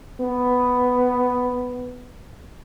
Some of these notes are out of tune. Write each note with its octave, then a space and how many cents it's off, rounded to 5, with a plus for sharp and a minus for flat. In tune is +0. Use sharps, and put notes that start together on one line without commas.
B3 +5